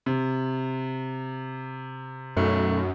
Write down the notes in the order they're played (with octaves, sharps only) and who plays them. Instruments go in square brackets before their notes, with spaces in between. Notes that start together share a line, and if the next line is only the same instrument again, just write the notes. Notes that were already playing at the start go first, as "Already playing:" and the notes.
[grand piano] C3
[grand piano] B1 A3 [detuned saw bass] F#2